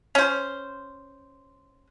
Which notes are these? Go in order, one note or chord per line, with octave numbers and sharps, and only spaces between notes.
C#4 C5